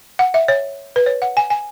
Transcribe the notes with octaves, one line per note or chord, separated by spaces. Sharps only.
F#5
E5
C#5
B4
C#5
F#5
G#5
G#5